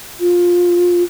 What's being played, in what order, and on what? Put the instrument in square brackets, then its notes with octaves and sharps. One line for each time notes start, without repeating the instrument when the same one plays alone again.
[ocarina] F4